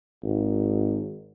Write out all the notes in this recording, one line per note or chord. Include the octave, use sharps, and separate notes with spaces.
G#1